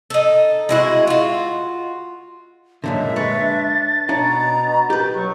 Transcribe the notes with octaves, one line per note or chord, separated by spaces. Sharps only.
D#4 A4
G#3 E4 F#4
F4 F#4
F#2 A#2 D3 G#3 E5 A5
B4 C#5 A6
D4
B2 D4 C#5 A#5
G4 B4 G6
F#3 C#6